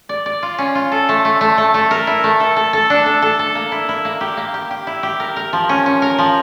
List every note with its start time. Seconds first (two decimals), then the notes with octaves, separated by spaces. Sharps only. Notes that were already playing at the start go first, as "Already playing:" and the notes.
0.09 D5
0.26 D5
0.43 F4
0.58 C#4
0.75 F4
0.92 A4
1.09 A3
1.25 A3
1.41 A3
1.58 A3
1.74 A3
1.91 A#4
2.07 E4
2.24 A3
2.40 A4
2.56 A4
2.73 A4
2.90 D4
3.06 A4
3.22 A4
3.39 A4
3.55 A#3
3.72 E4
3.89 E4
4.05 A#3
4.21 G4
4.37 A#3
4.54 G4
4.71 G4
4.87 E4
5.03 G4
5.20 A#4
5.36 A#4
5.53 F3
5.69 C#4
5.86 C#4
6.02 A#4
6.18 F3